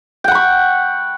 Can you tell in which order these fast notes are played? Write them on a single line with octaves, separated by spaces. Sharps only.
G5 F#5 B5 C#6